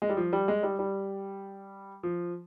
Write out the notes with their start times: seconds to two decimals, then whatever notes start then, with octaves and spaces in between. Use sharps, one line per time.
0.02 G#3
0.09 G3
0.17 F3
0.33 G3
0.48 G#3
0.63 G3
0.79 G3
2.03 F3